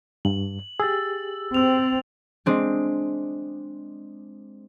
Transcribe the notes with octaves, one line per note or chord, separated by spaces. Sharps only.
G2 F#7
G4 G#4 E6 A6
C4 E6 F7
G#3 C4 D4